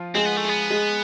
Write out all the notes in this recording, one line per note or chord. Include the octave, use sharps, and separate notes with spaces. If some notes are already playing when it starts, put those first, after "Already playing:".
Already playing: F3 F4
G#3 C4 G#4
B3
A3
B3 G#4
G#3 G#4